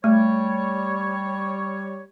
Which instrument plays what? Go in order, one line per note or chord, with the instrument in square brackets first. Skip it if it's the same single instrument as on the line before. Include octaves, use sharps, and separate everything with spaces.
[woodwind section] G3 C#5 [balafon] A3